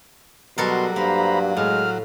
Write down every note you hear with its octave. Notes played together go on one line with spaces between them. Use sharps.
B2 F#3 G3 A4 A#4 C6
G2 A#3 C5 A#5 B5
A2 G#3 F6